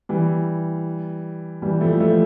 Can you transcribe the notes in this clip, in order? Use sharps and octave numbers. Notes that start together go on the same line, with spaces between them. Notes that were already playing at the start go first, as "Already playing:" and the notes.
E3 G3
E3 G3
F3 A3
F3 A3